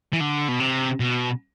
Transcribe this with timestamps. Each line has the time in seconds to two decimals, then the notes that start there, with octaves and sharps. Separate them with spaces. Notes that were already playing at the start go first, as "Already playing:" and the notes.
0.13 E3
0.21 D3
0.48 B2
0.60 C3
1.00 B2